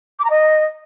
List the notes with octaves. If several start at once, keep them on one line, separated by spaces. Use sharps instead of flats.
D6
A#5
D#5